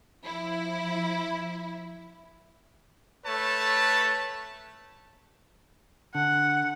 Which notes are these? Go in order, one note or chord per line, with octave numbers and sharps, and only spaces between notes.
F3 E4
A3 A4 B4 C#5 A5
D3 F#5